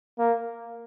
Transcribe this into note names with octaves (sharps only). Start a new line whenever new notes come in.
A#3